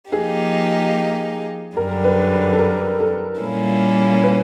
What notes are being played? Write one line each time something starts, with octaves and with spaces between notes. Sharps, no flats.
F3 A#3 D#4 G4 G#4
F#2 D3 G3 A#4
B4
A4
A#4
A4
A#2 G3 A#3 C#4 E4
B4